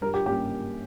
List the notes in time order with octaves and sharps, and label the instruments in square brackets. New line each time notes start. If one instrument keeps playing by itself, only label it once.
[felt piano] G2 [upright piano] A#4
[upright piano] G4
[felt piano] G3 A#3 C#4 [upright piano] G4